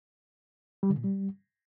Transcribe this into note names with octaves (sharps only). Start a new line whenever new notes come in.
G3
D3
A#2
G3